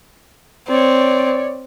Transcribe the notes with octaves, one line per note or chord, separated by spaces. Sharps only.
C4 C#5 D5